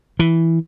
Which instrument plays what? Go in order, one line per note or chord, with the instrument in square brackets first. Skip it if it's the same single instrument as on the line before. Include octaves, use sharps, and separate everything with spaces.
[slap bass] E3